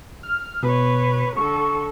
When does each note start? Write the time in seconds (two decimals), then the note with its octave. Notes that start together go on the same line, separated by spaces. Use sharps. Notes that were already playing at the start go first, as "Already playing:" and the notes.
0.23 F6
0.63 B2 B4 C#5
1.37 D3 A4 C#6